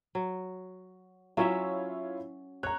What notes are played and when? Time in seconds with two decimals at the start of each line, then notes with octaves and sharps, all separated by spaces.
0.15 F#3
1.37 F#3 C#4 E4 F4 C#5 E5
2.63 C#5 A#5 F#6